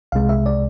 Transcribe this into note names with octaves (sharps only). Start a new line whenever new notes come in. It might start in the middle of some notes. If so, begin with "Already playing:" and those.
C2 C3 G#3 F5
E5
D5